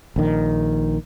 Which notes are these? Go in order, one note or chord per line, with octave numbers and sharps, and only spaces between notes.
A#1 D#3